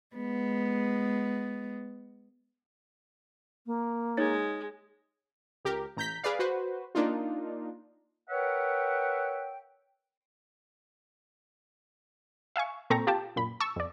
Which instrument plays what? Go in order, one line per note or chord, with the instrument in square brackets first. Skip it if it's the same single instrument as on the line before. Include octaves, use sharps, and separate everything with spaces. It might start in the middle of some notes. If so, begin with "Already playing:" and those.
[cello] G#3 B3
[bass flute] A#3
[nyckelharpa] G#3 [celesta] D#4 C#5 A6
[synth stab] C#2 G4 A#4
A1 A#5 G6 B6
G#4 B4 D5 F5
F#4 B4 C5
A#3 D4 D#4 F4
[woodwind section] A#4 B4 C#5 E5 F#5 G5
[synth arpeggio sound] E5 F5 G#5 C#6
A#2 C4 A4 A#5 C#6 A#6
F4 G4 G5 A5
F#2 A#2 B5
A5 C#6 E6
F2 D5